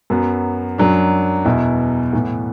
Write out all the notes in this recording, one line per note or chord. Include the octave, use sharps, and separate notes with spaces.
F#2 F#3 B3
F#2 F#3 D4
E2 B2 B3 E4
A2 E3 B3